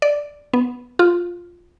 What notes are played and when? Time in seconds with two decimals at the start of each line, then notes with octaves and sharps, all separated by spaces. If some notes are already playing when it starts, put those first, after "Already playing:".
0.02 D5
0.53 B3
0.99 F4